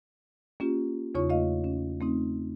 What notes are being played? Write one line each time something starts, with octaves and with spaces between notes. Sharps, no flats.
A#3 C#4 F4 G4
E2 C#3 D#4 F4 C#5 C#6
A3 F4 D#5 F5
C#4
A3 C4 D#4